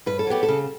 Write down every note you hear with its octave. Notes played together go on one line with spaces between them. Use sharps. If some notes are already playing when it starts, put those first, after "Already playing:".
G2 B4
A4
F#3 B3 G4
A4
C#3